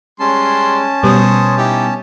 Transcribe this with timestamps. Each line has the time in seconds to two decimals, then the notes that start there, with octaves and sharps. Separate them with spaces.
0.20 G3 G#3 C#4 A5 C6
1.03 B2 G3 B3 C5 C#5 D#6
1.57 D#4 E4 G4